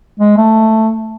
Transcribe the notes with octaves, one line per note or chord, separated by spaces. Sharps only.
G#3
A3